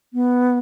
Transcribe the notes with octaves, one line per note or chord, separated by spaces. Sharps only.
B3